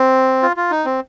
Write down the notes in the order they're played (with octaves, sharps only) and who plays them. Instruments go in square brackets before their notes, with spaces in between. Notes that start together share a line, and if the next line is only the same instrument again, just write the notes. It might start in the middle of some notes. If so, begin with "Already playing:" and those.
Already playing: [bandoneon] C4
F4
F4
D#4
C4